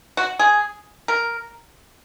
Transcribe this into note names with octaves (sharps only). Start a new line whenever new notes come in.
F#4
G#4
A#4